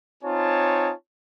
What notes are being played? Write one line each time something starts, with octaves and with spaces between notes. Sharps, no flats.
C4 D#4 F4 C#5 G#5 A5